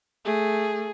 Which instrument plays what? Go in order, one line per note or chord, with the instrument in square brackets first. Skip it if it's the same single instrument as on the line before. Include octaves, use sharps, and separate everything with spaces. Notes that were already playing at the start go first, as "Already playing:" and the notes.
[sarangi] A3 [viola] G#4